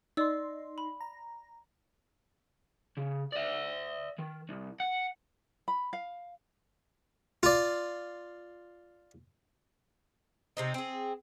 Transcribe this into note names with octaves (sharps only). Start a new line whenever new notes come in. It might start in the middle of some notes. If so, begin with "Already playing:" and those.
D#4 D5 C6 E6
B5
A#5
C#3
D5 E5
D#3
C2
F#5
B5
F5
F4 D5
C3 C4 D#4
C4 G#4